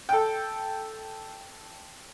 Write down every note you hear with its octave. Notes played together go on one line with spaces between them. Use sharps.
A4 G5